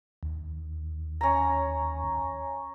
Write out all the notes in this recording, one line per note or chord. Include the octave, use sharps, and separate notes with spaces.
D#2
C#4 A#5